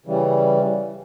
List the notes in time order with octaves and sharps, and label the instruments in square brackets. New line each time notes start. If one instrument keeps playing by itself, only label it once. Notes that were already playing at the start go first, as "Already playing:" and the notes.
[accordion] C#3 E3 G3